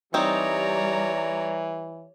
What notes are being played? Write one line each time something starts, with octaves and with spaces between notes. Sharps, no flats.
E3 G3 C4 D#4 C#5 D5 A#5